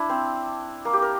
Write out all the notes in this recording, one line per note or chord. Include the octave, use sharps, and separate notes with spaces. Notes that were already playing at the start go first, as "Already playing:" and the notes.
Already playing: D4 E4
C4
A#3
G4
A#4